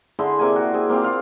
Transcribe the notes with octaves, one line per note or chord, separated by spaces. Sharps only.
D3 E4 G#4 C6
C3 A#3 G#4 G#5
F#4
C4 G#4
A#3 C4 F4 F5
F4 F5